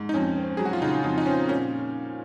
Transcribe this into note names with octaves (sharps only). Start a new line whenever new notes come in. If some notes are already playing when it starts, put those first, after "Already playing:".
Already playing: G#2
D#4
F2 C#4
C4
F#3 G#4
F#4
F4
C#3 D#4
F2 D#4
D#4
C4 C#4
A#2 C#4